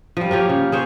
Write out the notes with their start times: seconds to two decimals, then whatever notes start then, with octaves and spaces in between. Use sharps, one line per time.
0.17 F3 G3
0.31 A#3 F4 G4 C#5
0.49 C#3
0.72 G#4 C5 C#5